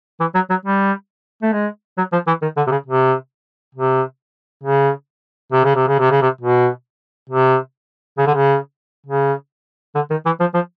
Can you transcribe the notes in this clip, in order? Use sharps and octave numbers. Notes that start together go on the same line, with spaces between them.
E3
F#3
F#3
G3
A3
G#3
F#3
F3
E3
D#3
D3
C3
C#3
C3
C3
C#3
C3
C#3
C3
C#3
C3
C#3
C3
B2
C3
C#3
D3
C#3
C#3
D3
D#3
E3
F3
F3